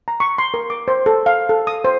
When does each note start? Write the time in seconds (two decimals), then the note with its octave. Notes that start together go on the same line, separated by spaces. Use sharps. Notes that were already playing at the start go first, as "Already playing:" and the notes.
0.08 A#5
0.20 C#6
0.38 C6
0.54 A#4
0.70 D6
0.88 C5
1.06 A4
1.26 F5
1.49 A4
1.67 D#6
1.84 C5